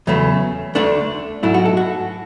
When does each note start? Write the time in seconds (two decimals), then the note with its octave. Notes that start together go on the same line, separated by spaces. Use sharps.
0.07 E2 C#3 F#3 A3 C#4
0.75 D2 D3 A3 D4
1.43 G#2 F#3 A3 E4
1.54 F#4
1.65 A4
1.77 F#4